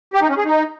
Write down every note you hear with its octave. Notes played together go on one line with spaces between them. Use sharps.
G4
D#4
C#4
G#4
D#4